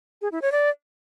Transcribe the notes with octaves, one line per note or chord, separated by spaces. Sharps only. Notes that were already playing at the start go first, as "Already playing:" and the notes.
G#4
E4
C#5
D5